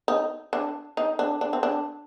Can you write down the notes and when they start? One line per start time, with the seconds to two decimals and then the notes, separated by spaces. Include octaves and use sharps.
0.08 D#4
0.53 D4
0.97 D#4
1.19 D4
1.41 D4
1.53 C4
1.63 D4